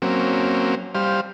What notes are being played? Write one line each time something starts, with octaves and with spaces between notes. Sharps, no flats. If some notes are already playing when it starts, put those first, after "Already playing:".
F#3 A#3 C4 C#4
G3 C5 F5